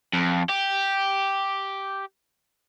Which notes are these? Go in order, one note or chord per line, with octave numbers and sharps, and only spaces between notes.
F2
G4